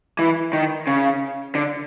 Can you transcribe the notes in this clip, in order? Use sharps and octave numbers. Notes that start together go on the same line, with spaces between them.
E3
D#3
C#3
D3